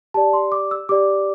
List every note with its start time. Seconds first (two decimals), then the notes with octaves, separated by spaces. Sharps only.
0.14 G4 D5 A5
0.33 C6
0.52 D6
0.71 E6
0.89 G4 D5 D6